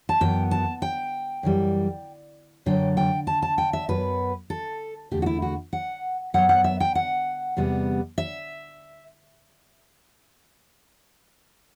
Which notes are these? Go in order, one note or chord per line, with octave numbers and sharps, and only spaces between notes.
A5
F#2 E3 B3 G5
A5
G5
F#2 E3 G3
F#2 D3 F#3 G5
G5
A5
A5
G5
E5
F#2 F#3 B3 B4
A4
E2 D3 A3 G4
F#4
E4
F#4
F#5
F#2 F#3 B3 F#5
F#5
E5
G5
F#5
E2 C3 G3 B3
E5